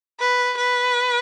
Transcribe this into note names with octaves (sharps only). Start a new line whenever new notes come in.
B4
B4